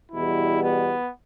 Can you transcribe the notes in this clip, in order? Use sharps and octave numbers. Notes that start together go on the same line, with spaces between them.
E2 B2 G3 E4
B3